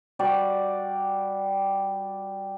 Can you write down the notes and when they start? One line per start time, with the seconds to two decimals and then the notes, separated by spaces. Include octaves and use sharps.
0.19 G3 F#4 G4 D5